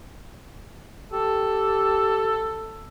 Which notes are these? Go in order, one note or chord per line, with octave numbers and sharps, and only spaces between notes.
G4 A4